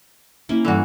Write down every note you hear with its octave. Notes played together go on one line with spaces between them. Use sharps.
A#3 C#4 E4
G2 E3 A3 F#4